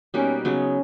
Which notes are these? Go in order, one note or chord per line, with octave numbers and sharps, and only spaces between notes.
B2 G3 A#3 C#4 D#4
C#3 F#3 B3 C#4 D#4